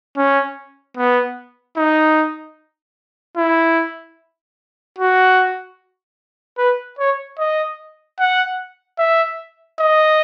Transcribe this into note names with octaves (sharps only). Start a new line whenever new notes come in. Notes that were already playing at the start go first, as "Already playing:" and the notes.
C#4
B3
D#4
E4
F#4
B4
C#5
D#5
F#5
E5
D#5